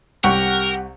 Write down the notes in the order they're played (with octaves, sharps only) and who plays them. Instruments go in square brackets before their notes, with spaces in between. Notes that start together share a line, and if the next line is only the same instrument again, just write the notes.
[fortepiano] C2 C#6 [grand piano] G4 F#5 [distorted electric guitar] A#4